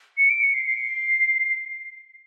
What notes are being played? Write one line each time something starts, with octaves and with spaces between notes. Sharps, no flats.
C#7
D7
C#7
C7
C7